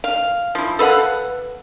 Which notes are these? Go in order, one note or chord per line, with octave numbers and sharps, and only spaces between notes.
F5
F3 E4
A4 B4 F5 F#5